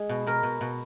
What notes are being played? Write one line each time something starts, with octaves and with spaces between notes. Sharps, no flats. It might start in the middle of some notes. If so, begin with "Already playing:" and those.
Already playing: G#3
B2
B2 A#4
B2
B2